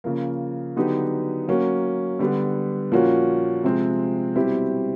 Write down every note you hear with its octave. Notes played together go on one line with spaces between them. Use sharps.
C#3 F3 A#3
D3 F#3 B3 D#4 G4
F#3 A#3 C#4 F#4
D3 G3 B3
A#2 F3 A#3 C#4 F#4
C3 F3 G#3 C4
B2 G3 C4 E4 G4